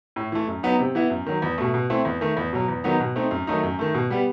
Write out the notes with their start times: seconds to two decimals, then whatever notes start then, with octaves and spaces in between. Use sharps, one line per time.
0.16 A2
0.32 E3 A3
0.48 F#2
0.63 F#3 B3 D#4
0.79 C3
0.95 E3 B3 E4
1.10 F#2
1.26 D#3 F#3
1.42 E2
1.58 B2 A3
1.74 B2
1.90 A3 C4 E4
2.05 E2
2.21 D#3 A3
2.37 E2
2.53 B2 F#3
2.68 E2
2.84 D#3 F#3 B3 D#4
3.00 B2
3.16 A3 C4 D#4
3.31 F#2
3.47 D#3 F#3 A3 D#4
3.63 F#2
3.79 D#3 A3
3.94 B2
4.10 G3 B3